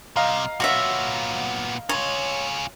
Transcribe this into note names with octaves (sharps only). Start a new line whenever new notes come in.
C3 G3 D#5 F5 A#5
A#2 B3 F#4 C#5 E5
C#4 F4 C#5